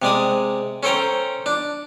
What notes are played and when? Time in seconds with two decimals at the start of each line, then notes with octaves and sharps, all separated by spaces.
0.02 C3 G#3 D5 D#6
0.83 C#4 A4 C5 G5 A#5
1.46 D4